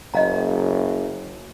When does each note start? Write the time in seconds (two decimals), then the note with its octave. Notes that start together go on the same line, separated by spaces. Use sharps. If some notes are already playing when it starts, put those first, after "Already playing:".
0.14 F#1 D#5 F5 A#5